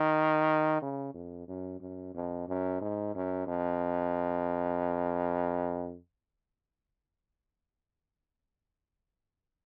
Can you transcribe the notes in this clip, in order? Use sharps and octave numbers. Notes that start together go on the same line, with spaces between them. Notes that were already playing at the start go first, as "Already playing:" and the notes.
Already playing: D#3
C#3
F2
F#2
F#2
F2
F#2
G#2
F#2
F2